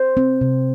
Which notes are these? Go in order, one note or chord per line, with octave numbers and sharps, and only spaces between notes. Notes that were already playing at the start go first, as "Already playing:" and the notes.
Already playing: C5
C4
C3